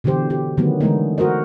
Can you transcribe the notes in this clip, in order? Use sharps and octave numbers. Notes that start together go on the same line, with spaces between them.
B2 D3 E3 G4 C5
G4
D3 D#3 F#3 A3 B3
D3 E3 G#3 A3 B3 D#4
F#4 A#4 C5 D#5